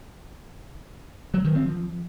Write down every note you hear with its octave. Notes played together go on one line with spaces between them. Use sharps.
F#3
D#3
C4
F3